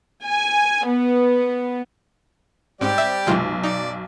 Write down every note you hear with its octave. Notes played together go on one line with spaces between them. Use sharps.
G#5
B3
G#2 G3 C4 G4 D5
E5
B1 F#2 C3 G#3 F4
D#4 D5